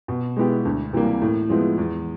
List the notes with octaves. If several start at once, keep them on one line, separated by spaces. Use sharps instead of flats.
B2
G#3 B3 E4 G4
D2
C3 E3 G3 A#3
A2
F3 G#3 B3 E4
E2